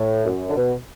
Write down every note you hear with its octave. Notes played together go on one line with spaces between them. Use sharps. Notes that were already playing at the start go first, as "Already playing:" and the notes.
Already playing: A2
F#2
D3
B2